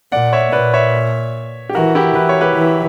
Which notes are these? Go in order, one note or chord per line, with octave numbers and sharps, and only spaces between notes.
A#2 D5 F#5
C#5 E5
A#2 B4 D5
C#5 E5
G4
E3 F#4 A#4
E4 G4
E3 B4
C#5
G4 B4
E3